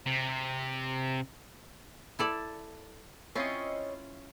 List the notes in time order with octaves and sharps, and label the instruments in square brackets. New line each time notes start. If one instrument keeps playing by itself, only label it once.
[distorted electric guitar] C3
[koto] E4 A4 D5
[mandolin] C4 C#5 D#5 [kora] C#4 E4 F4